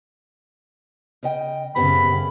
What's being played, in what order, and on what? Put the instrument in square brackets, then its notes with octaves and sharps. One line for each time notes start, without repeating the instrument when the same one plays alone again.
[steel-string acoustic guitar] C#3 D#5 G5
[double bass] F#2 C#3 [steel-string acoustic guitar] B3 C4 G4 [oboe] B5